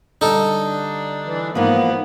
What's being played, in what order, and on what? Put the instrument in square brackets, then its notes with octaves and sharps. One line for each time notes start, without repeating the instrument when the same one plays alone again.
[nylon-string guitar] D3 G3 [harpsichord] D#4 A4
[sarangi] D4
[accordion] E3
[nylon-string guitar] G#2 E3 F3 [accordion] A#3 [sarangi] B3